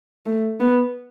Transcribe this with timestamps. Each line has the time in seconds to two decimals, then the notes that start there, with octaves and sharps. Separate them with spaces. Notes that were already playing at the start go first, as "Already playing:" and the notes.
0.26 A3
0.60 B3